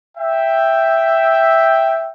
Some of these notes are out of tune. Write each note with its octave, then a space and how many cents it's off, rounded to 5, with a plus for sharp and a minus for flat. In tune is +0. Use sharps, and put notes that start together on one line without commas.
E5 +0 G5 +0